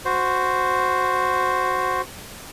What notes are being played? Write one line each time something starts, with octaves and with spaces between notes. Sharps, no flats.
F#4 C5